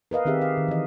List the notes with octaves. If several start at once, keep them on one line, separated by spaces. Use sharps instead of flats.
A#4 B4 D#5 F5
D#3 C4 G4 G#4 E5
F5
D#3
E3 D#5